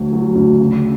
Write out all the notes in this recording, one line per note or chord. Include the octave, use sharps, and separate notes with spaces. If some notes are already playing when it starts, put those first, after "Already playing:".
Already playing: D2 F#3
F#3
D2
C#3